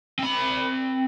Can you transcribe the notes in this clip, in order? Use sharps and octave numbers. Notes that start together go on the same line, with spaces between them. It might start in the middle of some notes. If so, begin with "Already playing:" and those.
C4 B5